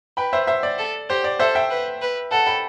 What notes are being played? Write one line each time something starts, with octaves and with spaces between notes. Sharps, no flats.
B4 G5 B5
C5 E5
C5 E5
D5
A4
G4 C5
D5
A4 C5 E5
E5 G5
B4
B4
A4 F#5 A5
G5 B5